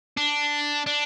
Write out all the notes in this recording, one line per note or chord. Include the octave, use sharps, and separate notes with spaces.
D4
D4